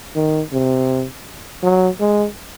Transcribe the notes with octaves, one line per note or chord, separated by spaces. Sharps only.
D#3
C3
F#3
G#3